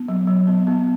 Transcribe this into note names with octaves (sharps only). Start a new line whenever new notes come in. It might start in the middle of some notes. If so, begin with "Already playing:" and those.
Already playing: B3
F#3
F#3
B3
B3